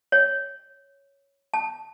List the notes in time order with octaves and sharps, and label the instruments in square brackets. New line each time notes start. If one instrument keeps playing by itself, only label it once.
[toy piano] C#5
A5